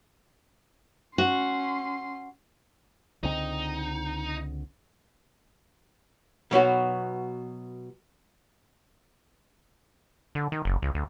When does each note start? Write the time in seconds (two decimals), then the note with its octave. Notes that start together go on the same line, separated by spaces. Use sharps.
1.18 C#4 F#4 C6
3.23 C#2 D3 C4 D#4
6.51 B2 F#3 B3 F#4
10.35 D3
10.52 D#3
10.65 F#1
10.82 C#2
10.95 D2